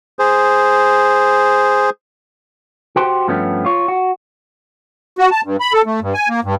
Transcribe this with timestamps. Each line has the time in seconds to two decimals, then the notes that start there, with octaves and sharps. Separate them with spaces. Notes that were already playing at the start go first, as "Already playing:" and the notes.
0.19 G#4 C5
2.96 F#4 G4 C5
3.28 G2 F3 A3 B3 C#4
3.65 F4 C#5
3.88 F#4
5.18 F#4
5.31 A5
5.44 G2
5.60 B5
5.73 A4
5.86 A3
6.01 G2
6.14 G#5
6.29 A#3
6.44 G2